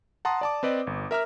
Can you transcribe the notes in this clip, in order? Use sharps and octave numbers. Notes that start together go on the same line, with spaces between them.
F#5 A5 A#5 C6 D#6
D5 A5 D6
C4 B4 D5 D#5
G1
A#4 E5 A#5 F6